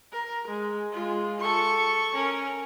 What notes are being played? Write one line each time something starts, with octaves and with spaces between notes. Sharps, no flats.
A#4
G#3
G#3 F4
A4 C#6
C#4 A#4